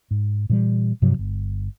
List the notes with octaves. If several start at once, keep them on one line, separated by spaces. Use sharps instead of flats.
G#2
A#2 E3 F#3 G3
G2 C3 F3 F#3
G1